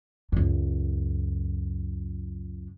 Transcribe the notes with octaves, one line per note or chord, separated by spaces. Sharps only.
C#2 F#2